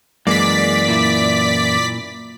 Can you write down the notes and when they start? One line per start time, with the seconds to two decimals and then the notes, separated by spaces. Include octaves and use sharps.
0.27 F#2 E3 G#3 A#3 D5 B6
0.88 A#2 E4